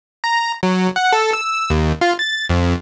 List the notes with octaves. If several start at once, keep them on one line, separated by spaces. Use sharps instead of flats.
A#5
F#3
F#5
A4
E6
D#2
F4
A6
F2